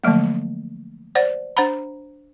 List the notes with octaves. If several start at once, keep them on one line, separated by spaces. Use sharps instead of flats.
D3 F3 F#3 A3 A#3
C5 D5 F#5
D4 C5 F#5 A#5 B5